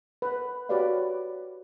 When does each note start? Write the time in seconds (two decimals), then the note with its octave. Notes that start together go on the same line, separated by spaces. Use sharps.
0.22 B4
0.69 F#4 G4 B4 C#5 D5 F5